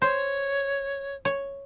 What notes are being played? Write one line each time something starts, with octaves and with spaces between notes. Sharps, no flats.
C5 C#5
C#5